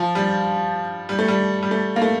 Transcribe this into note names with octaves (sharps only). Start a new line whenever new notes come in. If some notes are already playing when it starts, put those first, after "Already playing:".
Already playing: F3
G3
G3
A3
G3
G3
A3
A#3
A3